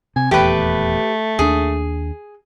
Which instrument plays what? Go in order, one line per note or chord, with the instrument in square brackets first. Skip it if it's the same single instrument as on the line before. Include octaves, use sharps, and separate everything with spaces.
[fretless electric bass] C3 [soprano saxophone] G#5
[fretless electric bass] D#1 E2 [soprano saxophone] A3 [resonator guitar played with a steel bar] G4 B4
[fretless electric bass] D#2 D4 [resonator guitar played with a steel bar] G#4